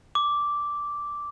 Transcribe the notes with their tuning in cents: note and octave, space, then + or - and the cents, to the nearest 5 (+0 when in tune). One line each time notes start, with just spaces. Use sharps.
D6 -5